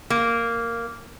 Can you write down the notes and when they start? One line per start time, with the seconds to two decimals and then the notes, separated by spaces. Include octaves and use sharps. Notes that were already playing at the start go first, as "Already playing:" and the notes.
0.10 A#3